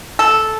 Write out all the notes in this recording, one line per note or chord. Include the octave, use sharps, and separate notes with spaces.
A4